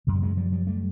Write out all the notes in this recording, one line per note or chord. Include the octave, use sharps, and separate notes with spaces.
F#2 C#3
G3
F#3 G#3
F3 G3
F3 G3
G3 A3